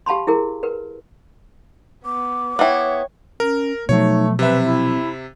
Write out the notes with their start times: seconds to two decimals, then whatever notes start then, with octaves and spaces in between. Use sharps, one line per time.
0.06 G4 F5 A5 B5 C6
0.27 E4 G#4 A#4
0.63 A#4 B4
2.05 B3 D6
2.59 B3 E4 C#5 E5 G5
3.40 C#4 A#4
3.89 B2 F3 F#3 A3 D#4 C#5
4.39 C3 C4 B4 E5
4.63 E4